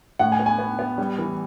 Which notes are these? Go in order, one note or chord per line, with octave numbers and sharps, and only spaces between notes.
A2 F#5
G#5
B3
G#5
B3
B3
G3
E3